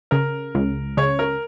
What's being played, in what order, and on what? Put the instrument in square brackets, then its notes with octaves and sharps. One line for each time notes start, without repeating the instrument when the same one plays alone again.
[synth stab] C#3 [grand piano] A#4
[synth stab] C#2
[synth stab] C#3 [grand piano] C#5
[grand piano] A#4